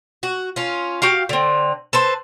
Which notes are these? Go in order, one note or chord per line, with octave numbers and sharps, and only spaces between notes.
F#4
C#4 F4
F#4 G4 F5
D3 C4
A4 B4 C5